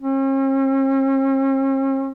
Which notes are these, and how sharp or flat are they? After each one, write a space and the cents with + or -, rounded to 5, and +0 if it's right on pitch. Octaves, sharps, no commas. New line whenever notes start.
C#4 -45